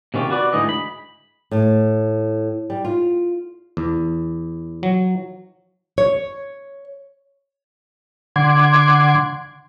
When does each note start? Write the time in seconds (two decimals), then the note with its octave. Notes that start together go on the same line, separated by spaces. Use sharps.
0.14 C3 D#3 C#4 F4 G4
0.30 F#4 B4 D5
0.53 D2 G#2 E3 D#5
0.69 B5
1.51 A2
2.70 G3
2.85 F4
3.77 E2
4.83 F#3
5.98 C#5
8.36 D3 F#5 C6 D6 G#6